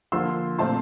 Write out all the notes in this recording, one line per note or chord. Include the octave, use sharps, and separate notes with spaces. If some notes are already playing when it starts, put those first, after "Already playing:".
D3 F3 A#3 C6 E6
A#2 A3 C4 A5 C6